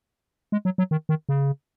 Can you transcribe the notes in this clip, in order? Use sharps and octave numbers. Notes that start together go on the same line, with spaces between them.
G#3
F#3
F#3
D#3
D#3
C#3